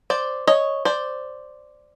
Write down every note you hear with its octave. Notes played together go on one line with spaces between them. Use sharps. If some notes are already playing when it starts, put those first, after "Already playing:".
C5 D5
C#5 D#5
C5 D5